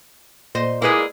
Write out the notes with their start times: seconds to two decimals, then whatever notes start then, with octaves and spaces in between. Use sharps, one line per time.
0.55 A#2 C5 D#5
0.82 G#3 A#3 E4 G#4 B4 D5